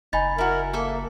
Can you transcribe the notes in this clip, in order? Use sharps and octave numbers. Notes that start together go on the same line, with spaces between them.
F#1 D#4 G#5 B5 A6
E4 F#4 A#4
A#3 A4 E5